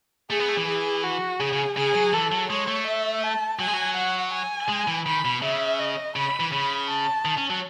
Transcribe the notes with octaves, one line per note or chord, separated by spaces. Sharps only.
A3 G#4
B3
A3
E3
G#4
F#4
C#3 G#4
C#3
C#3 G#4
F#3
E3 A4
F#3
G#3 C#5
A3
E5
A5
F#3 G#5
G#3
F#3
F#5
G#5
G#3
E3
D#3 B5
B2
C#3 E5
D#5
C#3 B5
E3
C#3 B5
A5
D#3
C#4
F#3